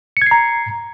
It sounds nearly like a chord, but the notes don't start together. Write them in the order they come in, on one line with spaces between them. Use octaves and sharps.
C#7 G#6 C7 A#5